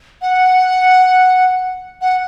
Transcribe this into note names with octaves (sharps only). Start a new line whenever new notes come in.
F#5
F#5